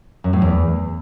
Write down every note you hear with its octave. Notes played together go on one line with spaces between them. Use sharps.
F#2
A2
E2